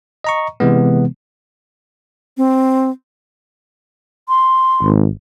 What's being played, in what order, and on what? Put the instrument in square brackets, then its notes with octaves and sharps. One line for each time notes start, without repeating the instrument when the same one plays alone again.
[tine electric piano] D#5 A#5 C#6
C3 E3 G#3 B3
[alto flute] C4
C6
[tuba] G#1